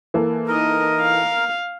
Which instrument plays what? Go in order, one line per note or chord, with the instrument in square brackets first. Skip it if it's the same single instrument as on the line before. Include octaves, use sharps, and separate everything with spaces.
[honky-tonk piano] E3 A#3 A4
[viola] D#4 D#5 [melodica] A#4
[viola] F5